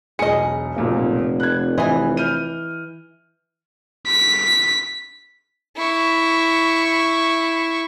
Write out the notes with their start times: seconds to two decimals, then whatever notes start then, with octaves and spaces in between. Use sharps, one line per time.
0.19 E1 B1 G#4 D#5 C#7
0.76 F1 B1 A#2 A#3
1.40 F#6 G#6
1.78 E3 D#5 G#5
2.17 F6 G6 D#7
4.07 B6
5.78 E4 C#6